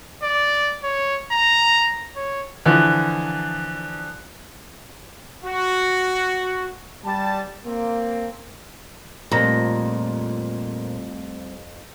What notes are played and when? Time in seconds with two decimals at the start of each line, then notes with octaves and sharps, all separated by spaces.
0.23 D5
0.84 C#5
1.32 A#5
2.16 C#5
2.66 D3 E3 F3
5.45 F#4
7.05 G3 A5
7.65 A#3 C4
9.31 F2 A#2 G3 A3 C4 A#5